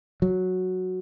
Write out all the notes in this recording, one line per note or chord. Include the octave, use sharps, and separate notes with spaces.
F#3